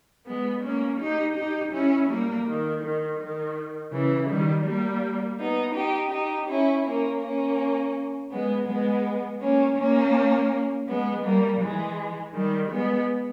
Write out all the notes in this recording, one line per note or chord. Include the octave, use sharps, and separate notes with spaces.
G#3 B3
A#3 C#4
D#4 G4
D#4 G4
C#4 E4
G3 A#3
D#3
D#3
D#3
C#3 E3
D#3 G3
G3 A#3
B3 D#4
D#4 G4
D#4 G4
C#4 E4
A#3 C#4
A#3 C#4
G#3 B3
G#3 B3
A#3 C#4
A#3 C#4
G#3 B3
G3 A#3
E3 G#3
D#3 G3
G#3 B3